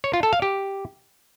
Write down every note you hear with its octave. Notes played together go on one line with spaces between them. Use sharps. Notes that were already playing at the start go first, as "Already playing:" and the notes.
C#5
F4
A4
F5
G4